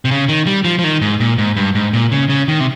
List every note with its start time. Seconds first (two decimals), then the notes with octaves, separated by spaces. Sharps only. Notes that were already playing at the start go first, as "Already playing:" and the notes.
0.05 C3
0.11 C#3
0.29 D#3
0.47 G3
0.65 F3
0.79 F3
0.84 D#3
1.01 G#2
1.20 A#2
1.38 G#2
1.56 G2
1.75 G#2
1.93 A#2
2.12 C#3
2.30 C#3
2.48 D#3
2.60 C3